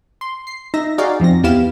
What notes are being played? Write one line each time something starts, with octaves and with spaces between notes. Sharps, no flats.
C6
C7
D#4 E5 A#6
D#4 F#4 G#4 D5 F5
F2 F3 C4 A#6
E2 B3 E4 G4 F5 E7